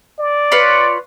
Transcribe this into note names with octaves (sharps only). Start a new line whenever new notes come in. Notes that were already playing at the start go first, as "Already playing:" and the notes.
D5
F4 B4 C#5